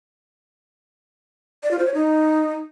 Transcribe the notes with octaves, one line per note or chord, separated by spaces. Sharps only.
D5
F4
C5
C#5
D#4